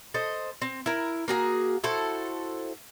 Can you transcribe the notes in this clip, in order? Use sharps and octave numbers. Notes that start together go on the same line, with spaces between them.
A4 C5 D#5
C4
E4 A#4
A#3 F#4 G#4
E4 F#4 A4 C5